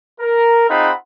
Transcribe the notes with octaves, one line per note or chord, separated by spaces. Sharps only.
A#4
C4 D#4 F4 G#4 F#5 B5